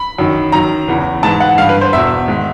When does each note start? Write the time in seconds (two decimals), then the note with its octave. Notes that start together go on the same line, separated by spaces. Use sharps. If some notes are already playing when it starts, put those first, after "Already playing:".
Already playing: B5
0.18 F#2 D#3
0.52 F#2 D#3 A#5
0.88 E2 C#3 E3
1.23 G#2 E3 A5
1.40 F#5
1.58 G2 D3 F5
1.69 B4
1.81 C5
1.93 E2 B2 E5
2.28 G#2 D#3